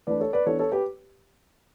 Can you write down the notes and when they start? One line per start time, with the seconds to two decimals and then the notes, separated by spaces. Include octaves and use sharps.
0.07 E3 A3 D4 B4 D5
0.20 A4 C#5
0.33 B4 D5
0.46 E3 B3 D4 A4 C#5
0.59 A4 C#5
0.72 G4 B4